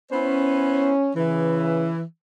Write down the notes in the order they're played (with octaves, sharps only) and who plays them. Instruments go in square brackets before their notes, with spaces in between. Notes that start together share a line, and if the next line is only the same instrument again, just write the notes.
[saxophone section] B3 E4 C5 [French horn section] C#4
[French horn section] C#3 B4 [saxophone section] E3